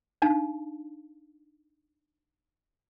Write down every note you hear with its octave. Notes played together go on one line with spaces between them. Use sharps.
D4 D#4 F5 A5